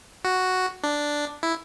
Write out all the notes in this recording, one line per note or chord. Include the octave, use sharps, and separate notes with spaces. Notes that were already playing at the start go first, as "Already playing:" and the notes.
F#4
D4
E4